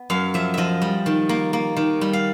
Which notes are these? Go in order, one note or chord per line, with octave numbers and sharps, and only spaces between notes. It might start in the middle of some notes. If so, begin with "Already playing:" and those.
Already playing: B3
F#2 F5
F3 E5
F3 D#5 E5
G3
D#3
A#3
A#3
D#3
G3
F5